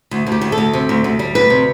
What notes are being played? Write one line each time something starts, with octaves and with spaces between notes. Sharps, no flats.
D2
D2
G4
D2
A4
D2
C3
D2
D2
G3
D2 B4
C3